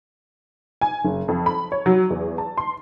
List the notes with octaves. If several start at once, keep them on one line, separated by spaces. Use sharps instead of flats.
G#5
F#1
F2
B5
C#5
F#3
E2
A5
C6